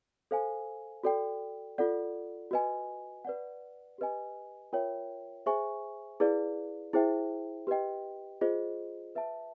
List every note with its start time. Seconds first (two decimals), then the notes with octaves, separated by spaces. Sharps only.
0.31 A4 C5 F5 G#5
1.03 F#4 A4 D5 G5
1.78 F4 A4 D5 F#5
2.51 F#4 B4 D#5 G#5
3.25 B4 D5 F#5
3.98 G4 B4 D#5 G#5
4.73 F4 A#4 C#5 E5 G5
5.46 G#4 C5 E5 G#5 C#6
6.20 E4 G#4 B4 D5 F5
6.93 E4 G#4 C5 E5 G5
7.67 G4 B4 D#5 G5
8.41 F4 G#4 C5 D#5
9.15 B4 E5 A5